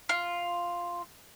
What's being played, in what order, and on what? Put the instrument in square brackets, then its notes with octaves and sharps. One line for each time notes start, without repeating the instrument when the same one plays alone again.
[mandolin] F4